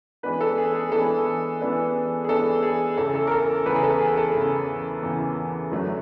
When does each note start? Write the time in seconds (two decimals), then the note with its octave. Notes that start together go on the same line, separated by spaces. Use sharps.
0.23 E3 G#3 B3 D4 B4
0.41 A4
0.58 G#4
0.75 G#4
0.92 E3 G#3 B3 D4 A4
1.60 E3 G#3 B3 D4
2.24 G#4
2.28 E3 G#3 B3 D4 A4
2.63 G#4
2.97 E2 C#3 E3 A4
3.15 A4
3.27 A#4
3.31 A4
3.66 E2 C#3 E3 B4
3.74 G#4
3.83 A4
4.00 G#4
4.17 A4
4.34 E2 C#3 E3
5.03 E2 C#3 E3
5.71 F#2 D3 F#3 A3 D4